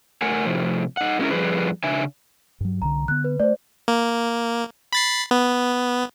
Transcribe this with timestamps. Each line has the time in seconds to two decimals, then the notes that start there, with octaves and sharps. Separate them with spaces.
0.22 A3 A#4 F#5 G#5
0.45 A2 C3 F3
0.97 D#4 F#5
1.19 G#3 A#3 C#4 D#4 E4 A#4
1.31 F2 B2 F3 G3 G#4 B4
1.84 C#3 D4 E5 G#5
2.61 G2 F#3
2.82 C2 D3 A#5
3.08 D3 B3 F#6
3.24 B4
3.40 A3 C5 D5
3.88 A#3
4.93 B5 A6 C7
5.31 B3